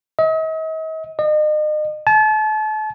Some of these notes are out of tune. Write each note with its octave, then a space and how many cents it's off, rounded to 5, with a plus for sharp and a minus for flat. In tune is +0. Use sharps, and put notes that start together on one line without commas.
D#5 +40
D#5 -40
A5 -35